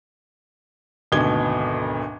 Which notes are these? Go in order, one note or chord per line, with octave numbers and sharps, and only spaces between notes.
G#1 D2 B2 G#6 G7